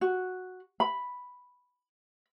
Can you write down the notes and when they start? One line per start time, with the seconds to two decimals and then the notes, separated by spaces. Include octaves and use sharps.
0.01 F#4
0.80 B5